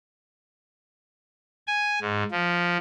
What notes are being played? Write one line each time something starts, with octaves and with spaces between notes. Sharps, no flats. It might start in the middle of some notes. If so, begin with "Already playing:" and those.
G#5
G#2
F3